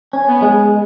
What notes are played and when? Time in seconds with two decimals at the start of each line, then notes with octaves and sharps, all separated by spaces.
0.13 C#4
0.28 B3
0.42 G#3